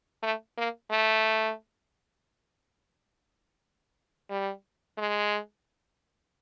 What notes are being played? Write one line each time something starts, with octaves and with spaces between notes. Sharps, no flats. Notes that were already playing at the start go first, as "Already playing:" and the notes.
A3
A#3
A3
G3
G#3